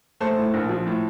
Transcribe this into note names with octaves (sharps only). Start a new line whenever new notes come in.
A3 A4 C5
A2
A#1
F3
A2